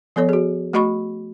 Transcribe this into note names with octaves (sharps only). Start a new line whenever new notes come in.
F3 B3 A4 C#5
F#4 G#4
A3 F#4 D#5 B5 C#6